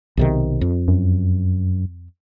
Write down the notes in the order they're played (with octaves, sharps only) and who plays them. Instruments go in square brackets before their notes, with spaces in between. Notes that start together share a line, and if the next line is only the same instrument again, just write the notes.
[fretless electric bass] B1 C3 D#3
F2
[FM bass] F#2